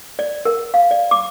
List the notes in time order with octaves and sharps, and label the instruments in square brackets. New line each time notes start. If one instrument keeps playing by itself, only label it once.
[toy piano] D5
A#4
F5
D5
D6